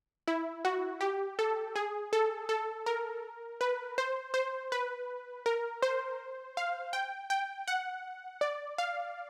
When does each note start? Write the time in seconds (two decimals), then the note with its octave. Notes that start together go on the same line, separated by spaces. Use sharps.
0.28 E4
0.65 F#4
1.01 G4
1.39 A4
1.76 G#4
2.13 A4
2.49 A4
2.86 A#4
3.61 B4
3.98 C5
4.34 C5
4.72 B4
5.46 A#4
5.82 C5
6.57 F5
6.93 G5
7.30 G5
7.68 F#5
8.41 D5
8.78 F5